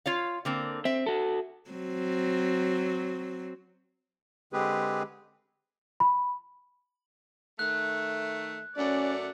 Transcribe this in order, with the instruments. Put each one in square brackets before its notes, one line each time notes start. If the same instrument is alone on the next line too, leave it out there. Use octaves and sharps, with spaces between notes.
[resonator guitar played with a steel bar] F4 C#5 F5
D3 A#3 C4
[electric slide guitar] C4 [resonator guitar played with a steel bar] E5
[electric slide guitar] F#4 A4
[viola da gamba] F#3 C4
[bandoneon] D3 G#3 C4 G4 G#4 B4
[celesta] B5
[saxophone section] D#3 A3 [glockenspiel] F#6
[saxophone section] F#2 A3 F#5 [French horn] C#4 [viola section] D5